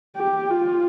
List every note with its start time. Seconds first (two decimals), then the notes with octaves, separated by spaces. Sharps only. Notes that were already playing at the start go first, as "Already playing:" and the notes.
0.17 G4
0.51 F4